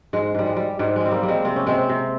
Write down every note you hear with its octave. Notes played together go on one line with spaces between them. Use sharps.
G#2 G#3
G#2 G3
G#3
G3
G#2 G3
G3 G#3
C4
G3 A#3
G3
G#3 C4
C3 C4
C#4
C3 G#3 C4
C3